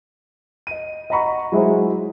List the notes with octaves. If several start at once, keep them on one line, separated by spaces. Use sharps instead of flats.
D#5 D#7
D#5 F#5 A#5 B5 C#6
F#3 G#3 E4 F#4 G#4 C5